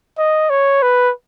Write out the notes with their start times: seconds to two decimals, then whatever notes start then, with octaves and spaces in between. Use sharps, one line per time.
0.18 D#5
0.50 C#5
0.82 B4